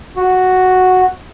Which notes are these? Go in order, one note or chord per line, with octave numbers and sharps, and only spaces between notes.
F#4